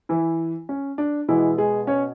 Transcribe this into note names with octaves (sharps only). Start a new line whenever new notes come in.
E3 E4
C#4
D4
B2 E3 G#3 B3 E4
G#3 G#4
C#4 C#5